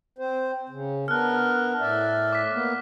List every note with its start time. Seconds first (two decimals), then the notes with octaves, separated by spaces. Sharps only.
0.18 C4 C5
0.69 C#3
1.08 B3 D4 A#4 F6 F#6
1.80 A2 D5 E5
2.33 D6 B6
2.52 A#3 B3